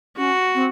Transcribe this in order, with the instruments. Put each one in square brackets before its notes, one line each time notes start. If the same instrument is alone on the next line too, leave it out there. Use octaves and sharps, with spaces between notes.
[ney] C#4 [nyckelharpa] F#4
[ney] C4